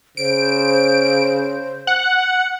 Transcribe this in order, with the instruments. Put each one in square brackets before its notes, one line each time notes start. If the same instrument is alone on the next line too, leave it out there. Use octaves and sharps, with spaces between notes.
[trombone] C#3 [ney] C5 [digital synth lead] D7
[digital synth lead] F#5